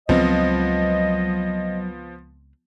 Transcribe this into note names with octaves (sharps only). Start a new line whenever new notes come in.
C#2 C#3 F3 F#3 B3 C4 D#5